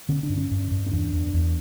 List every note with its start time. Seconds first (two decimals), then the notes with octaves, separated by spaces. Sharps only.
0.09 D3 C#4
0.23 D4
0.29 G2
0.38 C#4
0.51 G2
0.71 G2
0.86 C#4
0.92 E2 D4
1.12 E2
1.33 E2